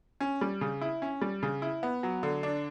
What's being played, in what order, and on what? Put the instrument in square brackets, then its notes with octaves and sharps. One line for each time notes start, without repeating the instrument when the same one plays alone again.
[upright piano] C#4
G3
C#3
E4
C#4
G3
C#3
E4
B3
F#3
D3
D4